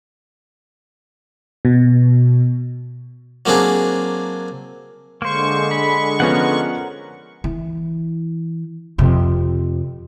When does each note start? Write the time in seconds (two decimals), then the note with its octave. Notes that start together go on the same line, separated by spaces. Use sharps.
1.65 B2
3.46 F#3 A#3 C4 D4 G#4
5.22 D3 G#3 A#3 C5 C#6
5.71 B5
6.20 F3 B3 C#4 A#4 F#5
7.44 E3
8.98 F2 C3